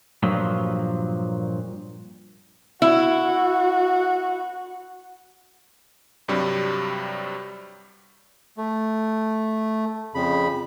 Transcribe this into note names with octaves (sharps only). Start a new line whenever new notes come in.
G2 A#2 F3 F#3
E4 F#4
G2 C3 F#3 G3
A3
F2 C#3 B5